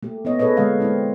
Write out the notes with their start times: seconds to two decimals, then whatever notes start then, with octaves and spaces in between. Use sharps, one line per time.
0.03 A3 A#3 G4
0.25 B3 E4 C#5 D#5
0.39 G#4 A4 B4 C#5 D#5
0.57 D3 G#3 A#3 D#5 F5
0.80 G#3 A#3 C4 E4